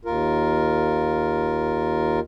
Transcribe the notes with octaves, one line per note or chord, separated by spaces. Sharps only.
D#2 F4 A#4